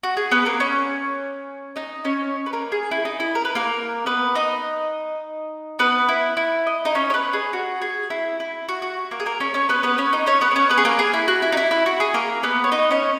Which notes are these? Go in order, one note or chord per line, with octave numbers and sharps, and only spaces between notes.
F#4
G#4
B3 B4
A#3 A#4
C#4 C#5
D#4 D#5
C#4 C#5
B4
A#3 A#4
G#4
E4
D#4
E4
A#4
B4
A#3 A#4
B3 B4
D#4 D#5
B3 B4
E4
E4
D#5
D#4 D#5
C#4 C#5
C#5
B3 B4
G#4
F#4
G#4
E4
E4
F#4
F#4
A#3 A#4
G#4
A#3 A#4
C#4 C#5
C#4 C#5
B3 B4
B3 B4
C#4 C#5
D#4 D#5
C#4 C#5
B3 B4
B4
C#4 C#5
B3 B4
G#4
A#3 A#4
G#4
E4
F#4
E4
D#4
E4
E4
F#4
G#4
A#3 A#4
B3 B4
C#5
D#4 D#5
C#4 C#5